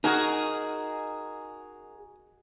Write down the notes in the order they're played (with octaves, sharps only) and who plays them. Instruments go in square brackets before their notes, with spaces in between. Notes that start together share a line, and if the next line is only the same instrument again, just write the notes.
[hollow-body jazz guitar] D#4 [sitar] F#4 G#4 A#4